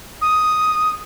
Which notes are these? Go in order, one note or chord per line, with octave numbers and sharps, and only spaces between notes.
D#6